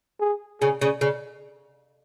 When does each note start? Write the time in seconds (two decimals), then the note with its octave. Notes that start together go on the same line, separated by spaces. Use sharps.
0.21 G#4
0.61 C#3 G#4
0.81 C#3
1.01 C#3